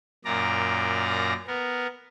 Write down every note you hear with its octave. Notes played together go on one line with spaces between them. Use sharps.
F#2 A#2 D5 A#5
B3 A#4